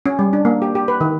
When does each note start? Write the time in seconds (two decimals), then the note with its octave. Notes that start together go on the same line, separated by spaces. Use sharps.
0.06 C#4
0.19 G3
0.33 D4
0.45 A#3
0.62 G4
0.75 G4
0.88 B4
1.01 D#3